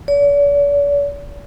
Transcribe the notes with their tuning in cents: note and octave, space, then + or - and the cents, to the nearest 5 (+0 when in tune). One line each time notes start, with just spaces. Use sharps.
D5 -45